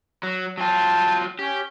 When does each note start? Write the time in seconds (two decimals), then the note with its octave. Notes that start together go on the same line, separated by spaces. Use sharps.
0.23 F#3
0.58 F#3 F4 G5 A5
1.39 C#4 G4